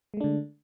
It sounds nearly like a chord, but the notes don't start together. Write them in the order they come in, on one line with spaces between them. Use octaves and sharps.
G#3 A3 D4 D3